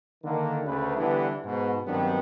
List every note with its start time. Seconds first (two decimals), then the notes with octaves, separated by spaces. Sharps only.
0.24 D3 D#3 A#3
0.65 D2 C#3 B4
0.97 D3 E3 G3 B3 D4
1.45 G#2 B2
1.86 G2 D#3 F#3 B3 C4 D4